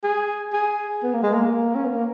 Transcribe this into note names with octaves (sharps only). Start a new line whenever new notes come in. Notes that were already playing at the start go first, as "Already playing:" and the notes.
G#4
G#4
B3
A#3
G#3
A#3
C#4
B3
A#3